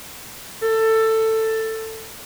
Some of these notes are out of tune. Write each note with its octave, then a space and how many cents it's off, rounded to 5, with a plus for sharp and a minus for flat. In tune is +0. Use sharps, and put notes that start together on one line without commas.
A4 +15